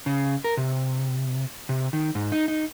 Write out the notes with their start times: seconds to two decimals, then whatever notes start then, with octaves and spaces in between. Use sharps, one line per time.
0.06 C#3
0.44 A#4
0.57 C3
1.69 C3
1.93 D#3
2.15 G#2
2.32 D#4
2.48 D#4